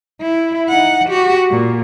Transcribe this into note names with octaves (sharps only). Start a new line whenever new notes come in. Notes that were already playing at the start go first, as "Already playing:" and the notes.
E4
D#4 F#5
F#4 G4
A#2